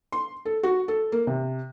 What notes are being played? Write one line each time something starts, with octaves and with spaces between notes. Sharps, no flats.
C6
A4
F#4
A4
A#3
C3